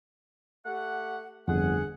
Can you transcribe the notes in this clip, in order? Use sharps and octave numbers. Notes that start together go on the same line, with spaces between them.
A3 G4 F#5
G1 F2 G#4 F#5